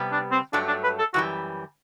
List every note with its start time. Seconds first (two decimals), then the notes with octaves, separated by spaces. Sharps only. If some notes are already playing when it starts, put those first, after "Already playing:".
Already playing: C3 G3 B3
0.12 D4
0.32 C4
0.53 G2 F#3 A3 D4
0.68 D4
0.84 B4
0.99 A4
1.14 F#2 E3 G3 F#4